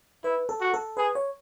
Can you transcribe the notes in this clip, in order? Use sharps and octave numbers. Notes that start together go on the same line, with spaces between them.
E4 B4
A4
F#4
A4
G#4 B4
C#5